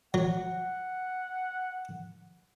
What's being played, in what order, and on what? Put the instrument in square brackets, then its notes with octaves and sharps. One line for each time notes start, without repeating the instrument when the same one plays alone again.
[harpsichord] F#3 [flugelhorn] F#5